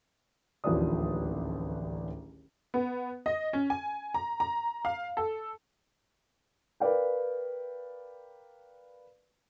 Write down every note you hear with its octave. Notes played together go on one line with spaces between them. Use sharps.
D1 A1 D#2 F3 D4 D#6
B3
D#5
C#4
G#5
A#5
A#5
F5
A4
A#4 B4 D5 F5 G5